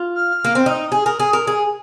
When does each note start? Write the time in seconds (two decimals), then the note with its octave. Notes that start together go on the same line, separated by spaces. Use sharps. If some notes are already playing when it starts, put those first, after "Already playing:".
Already playing: F4
0.15 F6
0.45 A#3
0.55 C4
0.66 D#4 F6
0.70 D#6
0.92 G#4
1.06 A#4
1.20 G#4
1.33 A#4
1.47 G#4